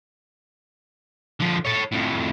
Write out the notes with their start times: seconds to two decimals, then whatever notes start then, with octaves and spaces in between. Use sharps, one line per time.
1.40 D3 F3
1.65 A4 C#5
1.92 F2 A2